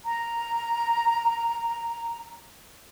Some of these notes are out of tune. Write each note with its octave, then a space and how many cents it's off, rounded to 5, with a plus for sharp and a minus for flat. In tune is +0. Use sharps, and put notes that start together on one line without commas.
A#5 +0